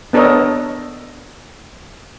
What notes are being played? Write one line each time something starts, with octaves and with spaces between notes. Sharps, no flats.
B3 D4 A4 A#4 C#5 D#5